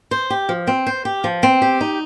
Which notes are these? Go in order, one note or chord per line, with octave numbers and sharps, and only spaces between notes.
C5
G4
F3
C4
C5
G4
F3
C4
G4
D#4